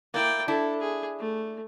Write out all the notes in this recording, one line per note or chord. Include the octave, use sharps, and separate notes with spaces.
A#3 E4 D5 G5
D4 E4 A4
G#4
A3